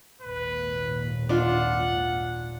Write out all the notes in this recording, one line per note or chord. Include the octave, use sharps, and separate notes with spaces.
G#1 D#2 A#2 B4
D4 F4 F#5